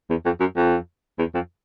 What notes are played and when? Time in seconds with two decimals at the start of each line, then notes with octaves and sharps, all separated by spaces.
0.10 E2
0.25 F2
0.40 F#2
0.57 F2
1.19 E2
1.34 F2